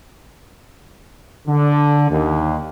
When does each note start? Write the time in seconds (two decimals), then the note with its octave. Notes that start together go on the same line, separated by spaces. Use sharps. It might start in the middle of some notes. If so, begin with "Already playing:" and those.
1.47 D3
2.10 D#2